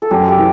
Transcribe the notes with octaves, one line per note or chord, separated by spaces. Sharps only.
A4
F#2 G4
G4
E3